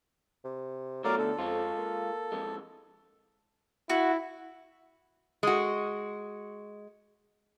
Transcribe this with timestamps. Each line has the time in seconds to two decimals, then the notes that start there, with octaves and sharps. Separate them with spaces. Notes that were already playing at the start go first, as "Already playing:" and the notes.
0.44 C3
1.04 B2 F#3 A3 A#4 D5 F5
1.18 D3 A4
1.39 F2 G#3 F4
1.78 A#3
2.32 F2 G#3
3.90 E4 F#4
5.43 G#3 F#4